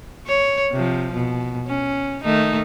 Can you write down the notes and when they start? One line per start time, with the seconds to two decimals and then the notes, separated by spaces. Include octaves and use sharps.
0.27 C#5
0.72 C3 F3
1.14 B2
1.67 C#4
2.24 D#3 A3 D#4